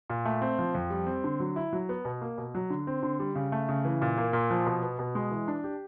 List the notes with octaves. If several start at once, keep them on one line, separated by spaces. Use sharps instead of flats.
A#2
A3
C4
F3
F2
G3
C4
D3
F#3
E4
F#3
B3
B2
A#3
B2
F#3
D3
C4
D3
G3
C#3
A3
C#3
E3
A#2
A#3
A#2
F3
B2
B3
B2
G#3
E3
D4
G4